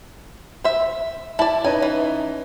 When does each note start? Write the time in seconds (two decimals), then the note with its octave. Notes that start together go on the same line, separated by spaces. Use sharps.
0.64 C5 E5
1.39 E4 D5 A5
1.64 C#4 D#4 B4 G#5
1.82 E3